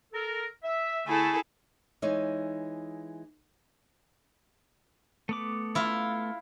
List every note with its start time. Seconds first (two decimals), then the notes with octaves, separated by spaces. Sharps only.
0.13 A4 A#4
0.63 E5
1.06 D3 A3 E4 G#4 A4
2.02 E3 G#3 D#4 C#5
5.29 A3 B3 D6
5.75 E4 F4